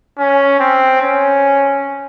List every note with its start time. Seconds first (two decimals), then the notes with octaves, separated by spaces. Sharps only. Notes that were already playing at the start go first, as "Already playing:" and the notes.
0.18 C#4
0.60 C4
1.02 C#4